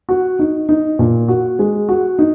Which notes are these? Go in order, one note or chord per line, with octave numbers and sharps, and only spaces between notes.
F#4
D#4
D#4
A#2
F#4
G#3
F#4
D#4